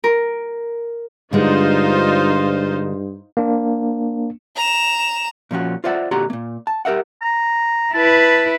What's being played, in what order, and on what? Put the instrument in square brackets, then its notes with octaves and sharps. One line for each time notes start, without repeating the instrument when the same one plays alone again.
[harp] A#4
[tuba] G2 [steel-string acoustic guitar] D3 G#3 [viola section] D#4 F4 C5
[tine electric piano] A#3 D4
[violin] A#5 E7
[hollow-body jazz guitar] A#2 F3 C#4 F#4
F4 C5 D5 E5 F#5
A#2 D3 F#4 G4 A#5 C6
A#2 A#3
A5
G4 A#4 E5 F#5
[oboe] A#5
[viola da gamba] E4 B4 [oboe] A5